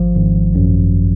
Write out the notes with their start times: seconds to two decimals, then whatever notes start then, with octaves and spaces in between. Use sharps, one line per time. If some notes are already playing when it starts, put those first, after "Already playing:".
Already playing: G#1 F3
0.16 G#1
0.55 F#2